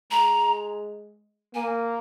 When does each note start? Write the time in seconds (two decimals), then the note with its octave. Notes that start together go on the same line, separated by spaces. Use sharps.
0.11 G#3 A#5
1.55 A#3 G#5